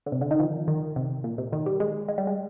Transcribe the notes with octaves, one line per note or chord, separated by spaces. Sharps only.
D3
C3
D3
D#3
F3
D#3
C3
A#2
C3
D#3
G3
G#3
G#3
G3
G#3